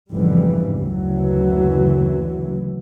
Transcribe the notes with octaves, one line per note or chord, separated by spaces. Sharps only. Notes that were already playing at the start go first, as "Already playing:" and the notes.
F1 G#2 C#3 E3 G3
F#1 D2 E3 F#3